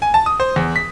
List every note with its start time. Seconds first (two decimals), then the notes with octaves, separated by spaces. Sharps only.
0.02 G#5
0.14 A5
0.26 D#6
0.40 C5
0.56 E2
0.76 B6